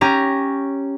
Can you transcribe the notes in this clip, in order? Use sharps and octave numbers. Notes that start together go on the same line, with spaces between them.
C#4 G4 A#5